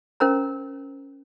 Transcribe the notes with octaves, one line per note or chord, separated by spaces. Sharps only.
C#4 A#4 C5 A#5